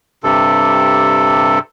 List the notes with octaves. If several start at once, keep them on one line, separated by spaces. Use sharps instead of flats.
G2 C3 A4